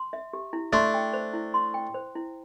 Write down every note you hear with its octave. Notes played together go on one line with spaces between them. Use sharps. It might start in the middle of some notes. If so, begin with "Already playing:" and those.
Already playing: C6
E5
G4
E4
A3 D4 C6
G5
C5
E4
C6
G5
C5
E4